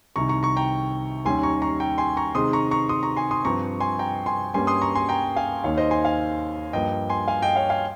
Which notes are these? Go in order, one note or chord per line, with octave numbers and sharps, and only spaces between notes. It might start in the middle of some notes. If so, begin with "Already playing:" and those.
C2 C3 D#3 A#5 C#6
A#5 C#6
A#5 C#6
G5 A#5
D#2 D#3 G3 C#4 G#5 C6
A#5 C#6
A#5 C#6
G5 A#5
G#5 C6
A#5 C#6
C3 D#3 G#3 C4 C6 D#6
A#5 C#6
A#5 C#6
C6 D#6
A#5 C#6
G#5 C6
C6 D#6
G2 F3 C4 A#5 C#6
G#5 C6
G5 A#5
G#5 C6
G2 G3 A#3 C#4 G#5 C6
C6 D#6
A#5 C#6
G#5 C6
G5 A#5
F5 G#5
D#2 D#3 A#3 C#5 F5
C5 D#5
G#5 C6
F5 G#5
G2 F3 A#3 D#5 G5
G#5 C6
F5 G#5
D#5 G5
C#5 F5
F5 G#5